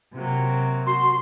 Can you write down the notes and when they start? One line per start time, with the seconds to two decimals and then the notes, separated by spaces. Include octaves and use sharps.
0.14 C3 F#3 A#3
0.87 F#4 C6